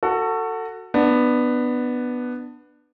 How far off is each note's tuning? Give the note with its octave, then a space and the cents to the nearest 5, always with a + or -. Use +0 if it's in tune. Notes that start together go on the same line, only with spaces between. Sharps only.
F#4 +0 A4 +25
B3 +0 D4 +20